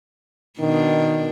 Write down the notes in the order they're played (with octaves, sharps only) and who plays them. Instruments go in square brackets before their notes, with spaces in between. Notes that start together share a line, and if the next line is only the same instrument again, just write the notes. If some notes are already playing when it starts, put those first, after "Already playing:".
[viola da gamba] B2 D4 [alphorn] D#3